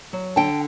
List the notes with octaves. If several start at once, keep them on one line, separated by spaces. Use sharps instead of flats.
F#3
D3 G5 A5